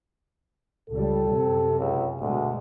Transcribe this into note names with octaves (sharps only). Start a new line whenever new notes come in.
C#2 G3 A4
F#2 C3
C#2
D2 B2 G#3